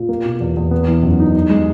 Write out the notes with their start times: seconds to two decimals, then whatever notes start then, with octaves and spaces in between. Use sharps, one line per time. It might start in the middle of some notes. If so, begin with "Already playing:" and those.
Already playing: A#2
0.09 A#3
0.25 B2
0.40 E2
0.56 E2
0.71 B3
0.88 E3
1.03 F#2
1.20 D#4
1.35 D#4
1.50 G#3